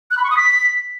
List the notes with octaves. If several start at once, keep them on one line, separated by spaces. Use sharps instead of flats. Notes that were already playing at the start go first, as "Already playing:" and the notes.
F#6
B5
C#6
D#6
B6